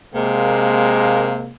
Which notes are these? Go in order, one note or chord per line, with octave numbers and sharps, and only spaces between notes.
C3 G#3 A#3